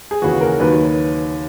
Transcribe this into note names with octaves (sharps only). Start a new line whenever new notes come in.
G#4
D#2 C#3 E3 F#4
A#4
D#2 D#3 F#3 B4